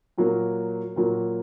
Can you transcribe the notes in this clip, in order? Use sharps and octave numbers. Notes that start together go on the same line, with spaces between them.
A#2 F#3 A#3
A#2 F#3 A#3